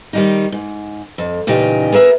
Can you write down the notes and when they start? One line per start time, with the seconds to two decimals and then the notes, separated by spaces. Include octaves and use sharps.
0.13 D#3 G3 D#4
0.52 G#2
1.18 F2
1.47 E2 A#2 C#3 D#4 G4
1.92 B3 G#4 A#4 E5